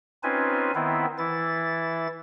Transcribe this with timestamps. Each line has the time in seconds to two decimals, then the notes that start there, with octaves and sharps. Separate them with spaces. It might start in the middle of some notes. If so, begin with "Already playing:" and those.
0.23 C4 C#4 D#4 F4 B4 G#5
0.75 D#3 B3 C4 E4
1.18 E3 E4 A6